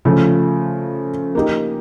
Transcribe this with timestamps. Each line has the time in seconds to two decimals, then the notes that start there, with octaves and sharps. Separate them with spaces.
0.05 C#3 F3 A3
1.35 A#3 D#4 G4